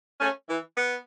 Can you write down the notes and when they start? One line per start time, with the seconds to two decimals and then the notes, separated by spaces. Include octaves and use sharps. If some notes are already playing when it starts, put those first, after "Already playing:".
0.20 A3 C#4
0.49 E3
0.76 B3